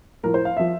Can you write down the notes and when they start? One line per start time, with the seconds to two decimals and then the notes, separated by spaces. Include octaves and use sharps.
0.23 A2 F3 A#4
0.34 C5
0.45 F5
0.57 F3 E5